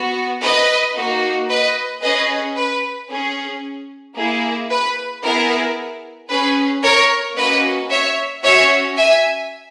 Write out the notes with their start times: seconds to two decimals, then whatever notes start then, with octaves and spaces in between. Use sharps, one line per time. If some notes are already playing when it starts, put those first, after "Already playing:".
Already playing: B3 F#4
0.42 B4 D#5
0.96 A#3 D#4 F#4
1.49 B4 D#5
2.03 C#4 G#4 B4 D#5
2.57 B4
3.10 C#4 G#4
4.17 A#3 E4 G#4
4.70 B4
5.23 B3 E4 G#4 A#4
6.30 C#4 G#4 B4
6.83 A#4 C#5
7.37 A#3 C#4 F#4 B4 D#5
7.90 C#5 E5
8.43 C#4 F#4 C#5 E5
8.97 E5 G#5